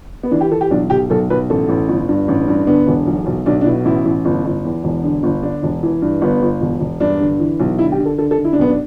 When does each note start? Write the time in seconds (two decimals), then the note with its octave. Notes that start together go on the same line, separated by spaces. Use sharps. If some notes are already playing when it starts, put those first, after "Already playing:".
0.23 B3
0.31 E3 D4
0.41 G4
0.51 E3 A4
0.61 G4
0.71 B1 D4
0.90 B1 G4
1.10 B1 A4
1.30 B1 B4
1.50 A1 A4
1.69 A1
1.88 G1
2.09 G2
2.28 A1
2.48 G2
2.67 D3 B3
2.87 E1
3.07 B1
3.26 B1
3.46 B1 D4
3.61 D4
3.66 B2 E4
3.85 A1 E4
4.05 A1
4.25 G1
4.45 G1
4.65 E2
4.84 E1
5.04 D3
5.23 G1
5.42 D3 D4
5.63 E1
5.83 E3
6.02 G2
6.21 G1 B3
6.42 G1
6.61 E1
6.80 E1
7.00 G2 D4
7.20 D3
7.40 E3
7.60 B1
7.79 D3 E4
7.92 G4
7.98 D3
8.06 A4
8.18 D3 A4
8.31 A4
8.38 D3
8.45 E4
8.53 D4
8.58 B1 B3
8.69 D4